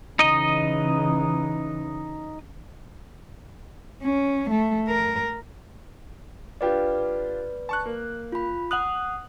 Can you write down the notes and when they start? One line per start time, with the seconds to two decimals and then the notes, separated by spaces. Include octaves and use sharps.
0.19 C#3 E3 D#4 D#5
4.03 C#4
4.51 A3
4.88 A#4
6.61 D4 F4 G4 B4 D5
7.69 A5 C#6 F#6
7.86 A#3
8.32 F4 B5
8.71 F#5 D#6 F#6 F7 F#7